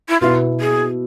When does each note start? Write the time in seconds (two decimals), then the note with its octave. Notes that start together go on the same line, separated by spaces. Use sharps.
0.09 E4
0.20 B2 B3 E4 F4
0.60 G#4